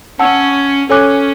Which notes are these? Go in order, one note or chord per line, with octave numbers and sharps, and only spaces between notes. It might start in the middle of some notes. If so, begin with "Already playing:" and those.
C#4 F#5 A5 E6
C#4 A4 C#5 G#5 D6 F#6